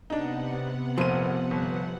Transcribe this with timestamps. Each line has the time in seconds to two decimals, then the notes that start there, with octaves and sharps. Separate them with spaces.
0.10 C3 B3 D4 D#4 F#5
0.98 F1 A#2 F3 D#7
1.51 G1